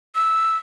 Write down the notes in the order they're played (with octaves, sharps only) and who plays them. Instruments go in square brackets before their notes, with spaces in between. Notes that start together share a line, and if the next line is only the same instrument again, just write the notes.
[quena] E6